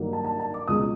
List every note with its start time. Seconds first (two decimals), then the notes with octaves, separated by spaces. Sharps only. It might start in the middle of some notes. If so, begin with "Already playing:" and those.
Already playing: G2 D#3 F#3 A#3
0.13 A5
0.25 A5
0.39 A5
0.54 D6
0.68 C#2 B2 G#3 D#6